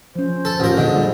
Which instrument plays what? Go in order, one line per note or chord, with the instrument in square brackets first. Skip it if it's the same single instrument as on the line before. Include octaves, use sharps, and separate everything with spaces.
[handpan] F3 C#4 [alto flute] C5
[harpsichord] A4
[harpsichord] A1 A#4 [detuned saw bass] F4
[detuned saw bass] A#2 [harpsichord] D3 [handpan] G#4 D#5
[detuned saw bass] G3 [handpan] F4